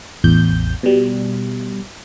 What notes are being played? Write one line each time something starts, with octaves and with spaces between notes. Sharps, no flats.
A1 E2 G6
B2 G3